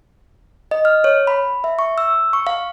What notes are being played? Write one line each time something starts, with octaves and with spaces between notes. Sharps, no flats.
D#5
F6
C#5
B5
E5
C#6
E6
C#6
F5